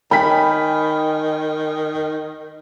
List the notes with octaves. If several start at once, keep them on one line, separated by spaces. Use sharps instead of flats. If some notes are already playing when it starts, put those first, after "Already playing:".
D#3 G5 G#5 B5 B6